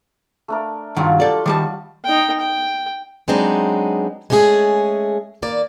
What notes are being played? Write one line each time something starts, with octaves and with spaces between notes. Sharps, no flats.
A3 D4 A#4
G2 D#3 F#3 G3 F4
A4 D5
D#3 G3 D5 A5
D#4 G5
G5
F#3 G#3 B3 C4 D4 D#4
G#3 A3 C#4 G4 G#4
D#3 A#3 D5